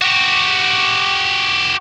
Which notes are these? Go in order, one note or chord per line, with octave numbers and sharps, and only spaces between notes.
F#4 G4